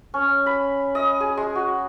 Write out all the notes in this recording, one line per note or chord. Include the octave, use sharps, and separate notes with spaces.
C#4
B5
D#5
G#4
G#3
F#4